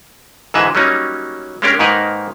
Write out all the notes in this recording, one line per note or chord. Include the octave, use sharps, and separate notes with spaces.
G#2 D3 E3 G#3 B4 E5
F#3 G3 A#3 C#4 D#4
G#3 A#3 C#4 D4 G4 A#4
G#2 D#3 A#3 D#4 A#4 B4